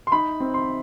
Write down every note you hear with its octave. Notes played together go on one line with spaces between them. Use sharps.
C6
D#4 B5
C4
C6